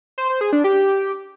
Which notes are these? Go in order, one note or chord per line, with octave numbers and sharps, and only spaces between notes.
C5
C5
G#4
D4
G4